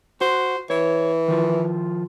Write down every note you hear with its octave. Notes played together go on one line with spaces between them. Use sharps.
F#4 C5
E3 C#5
D#3 F3